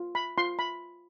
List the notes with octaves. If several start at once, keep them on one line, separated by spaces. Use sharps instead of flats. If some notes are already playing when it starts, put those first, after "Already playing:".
Already playing: F4
B5
F4 C6
B5